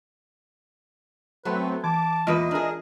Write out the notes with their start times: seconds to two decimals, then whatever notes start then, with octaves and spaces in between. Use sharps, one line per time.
1.45 F#3 A3 B3 C4 B4
1.84 E3 A5 D6
2.27 E2 A#2 G#3 F4 B4 D#5
2.51 D4 G#4 A#4